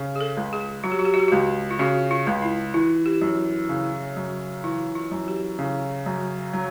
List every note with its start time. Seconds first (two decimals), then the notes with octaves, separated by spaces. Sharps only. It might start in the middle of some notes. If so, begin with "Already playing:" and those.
Already playing: C#3
0.16 G#4
0.21 A4
0.37 C#2
0.53 G#4
0.84 F#3 F#4
0.92 G4
0.99 F#4
1.05 G4
1.14 F#4
1.20 G4
1.28 C#2 F#4
1.71 F4
1.79 C#3 F#4
2.11 F4
2.27 C#2
2.42 E4
2.74 E3 F4
3.06 G4
3.21 F#2
3.69 C#3
4.16 F#2
4.64 E3 F4
4.95 F4
5.11 F#2
5.28 G4
5.59 C#3
6.06 F#2
6.53 F#3